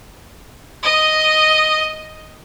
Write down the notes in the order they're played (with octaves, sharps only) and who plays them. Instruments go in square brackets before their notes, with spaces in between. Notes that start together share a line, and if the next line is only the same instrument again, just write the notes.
[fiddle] D#5 D#6